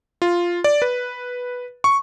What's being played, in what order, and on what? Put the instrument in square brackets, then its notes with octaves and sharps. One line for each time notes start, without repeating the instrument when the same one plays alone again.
[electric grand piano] F4
D5
B4
C#6